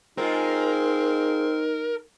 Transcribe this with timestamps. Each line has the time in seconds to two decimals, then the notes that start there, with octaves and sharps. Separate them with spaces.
0.18 G#3 C4 D#4 F4 A#4